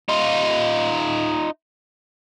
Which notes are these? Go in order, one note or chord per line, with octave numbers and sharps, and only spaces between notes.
D#4 F4